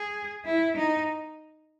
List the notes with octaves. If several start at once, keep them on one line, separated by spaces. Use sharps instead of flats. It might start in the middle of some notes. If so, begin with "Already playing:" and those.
Already playing: G#4
E4
D#4